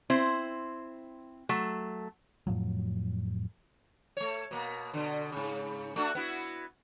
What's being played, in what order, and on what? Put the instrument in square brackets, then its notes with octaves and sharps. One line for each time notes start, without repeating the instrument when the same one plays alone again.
[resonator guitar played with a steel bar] C4 E4 C5
F#3 A3
[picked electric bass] F2 A2 F3 F#3
[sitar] A3 C#5
B2 A#3
B2 D3
G#2 C#3
A3 D4 F#4
B3 E4 F#4